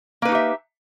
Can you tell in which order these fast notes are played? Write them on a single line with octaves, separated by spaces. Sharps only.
A#3 B4 D#4 G4 E5